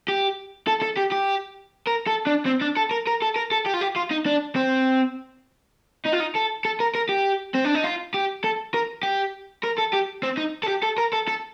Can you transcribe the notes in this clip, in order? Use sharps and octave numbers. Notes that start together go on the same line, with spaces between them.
G4
A4
A4
G4
G4
A#4
A4
D4
C4
D4
A4
A#4
A#4
A4
A#4
A4
G4
F4
G4
F4
D#4
D4
C4
D#4
F4
D#4
A4
A4
A#4
A#4
G4
C4
D4
D#4
F4
G4
A4
A#4
G4
A#4
A4
G4
C4
D#4
A4
G4
A4
A#4
A4
A4